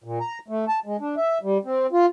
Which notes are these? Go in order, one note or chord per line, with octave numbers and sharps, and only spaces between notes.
A#2
A#5
A3
A5
G#3
D4
E5
G3
C4
F4